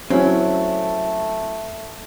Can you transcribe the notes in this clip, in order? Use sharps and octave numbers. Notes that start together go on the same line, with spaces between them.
F#3 A3 C4 C#4 E4